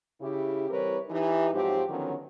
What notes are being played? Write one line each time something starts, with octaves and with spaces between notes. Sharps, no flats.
C#3 E4 G4
E3 G3 C4 A#4 B4 C#5
E3 D#4 G4
G#2 F3 F#3 C4 G4
D3 D#3 F3 F#3 B3 C#4